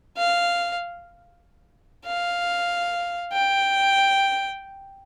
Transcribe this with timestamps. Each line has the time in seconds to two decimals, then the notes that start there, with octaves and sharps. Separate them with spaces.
0.17 F5
2.06 F5
3.33 G5